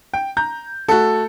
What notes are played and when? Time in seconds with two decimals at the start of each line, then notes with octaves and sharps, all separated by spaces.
0.14 G5
0.37 A#5 G6
0.88 A3 F#4 A4